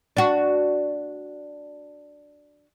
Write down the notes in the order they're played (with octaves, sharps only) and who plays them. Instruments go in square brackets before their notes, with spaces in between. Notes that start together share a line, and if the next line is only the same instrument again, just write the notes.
[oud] D4 F#4